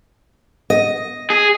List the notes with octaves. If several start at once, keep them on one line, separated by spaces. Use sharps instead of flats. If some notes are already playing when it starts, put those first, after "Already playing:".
D#5
G#4